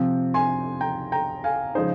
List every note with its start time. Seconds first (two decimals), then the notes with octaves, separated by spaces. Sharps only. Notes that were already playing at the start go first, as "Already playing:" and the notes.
Already playing: C3 F3 C4
0.34 G#5 C6
0.81 G5 A#5
1.12 G5 A#5
1.44 F5 G#5
1.75 C#3 F3 G#3 D#4 G#4 C5